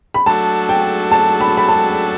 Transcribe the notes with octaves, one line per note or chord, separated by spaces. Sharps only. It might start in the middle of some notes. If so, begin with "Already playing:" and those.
B5
F#3 A3 D4 F#4 A4 A5
G5
A5
B5
B5
A5